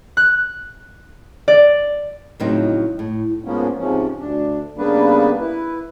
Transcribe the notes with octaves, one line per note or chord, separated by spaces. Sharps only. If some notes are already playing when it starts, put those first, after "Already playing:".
F#6
D5
A2 C#3 F3 F#3 C4 D#4
A2
G#2 F3 G#3 A#3 B3 C#4
G#2 C3 F3 C#4
D2 D4
C#3 G3 A#3 B3 D4 B4
E4 B4